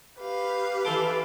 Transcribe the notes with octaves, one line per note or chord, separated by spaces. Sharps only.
G4 B4 F5
E3 A4 C6 D6